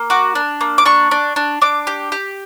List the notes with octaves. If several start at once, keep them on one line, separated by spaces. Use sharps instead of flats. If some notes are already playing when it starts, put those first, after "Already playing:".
Already playing: A#3
F#4 D6
D4
A#3
D6
D4 C#6
D4
D4
D4 D6
G4
G4